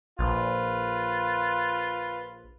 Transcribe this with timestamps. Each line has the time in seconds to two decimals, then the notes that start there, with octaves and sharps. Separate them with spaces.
0.19 A#1 F4 B4